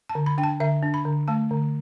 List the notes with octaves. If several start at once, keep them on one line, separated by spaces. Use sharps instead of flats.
A5
D3
B5
D4 G5
A5
D3 E5
D4
B5
D3
A3 A5
D3